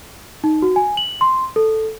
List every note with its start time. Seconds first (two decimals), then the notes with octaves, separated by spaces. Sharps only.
0.44 D#4
0.62 F#4
0.76 G#5
0.97 F#7
1.21 C6
1.56 A4